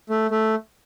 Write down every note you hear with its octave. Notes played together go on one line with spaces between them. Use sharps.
A3
A3